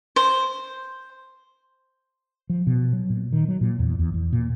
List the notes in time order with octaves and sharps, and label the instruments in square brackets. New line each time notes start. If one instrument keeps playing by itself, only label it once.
[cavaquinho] C5
[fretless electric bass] F3
B2
F#3
A#2
D#3
F#3
A#2
E2
E2
E2
A#2